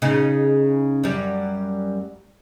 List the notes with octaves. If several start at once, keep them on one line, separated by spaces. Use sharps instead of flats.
C#3 D#4
F#2 G3